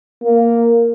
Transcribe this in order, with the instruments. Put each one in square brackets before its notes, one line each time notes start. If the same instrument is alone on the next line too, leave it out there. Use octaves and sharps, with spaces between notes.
[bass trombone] A#3